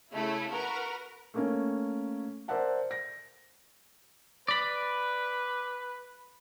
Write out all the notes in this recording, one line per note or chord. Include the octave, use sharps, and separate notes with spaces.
C#3 A3 E4
F#4 A#4 B4
A3 A#3 C#4
A#4 C5 D5 E5 F#5 A5
A#6
B4 D5 B5